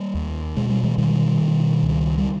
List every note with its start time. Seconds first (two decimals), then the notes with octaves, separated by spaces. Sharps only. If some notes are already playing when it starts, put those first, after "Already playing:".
Already playing: G3 A#3
0.14 D#2
0.56 B2 G#3
0.69 G3
0.83 E3 G#3
0.98 B2 D#3 G3
1.41 B2
1.83 C#2
2.18 G3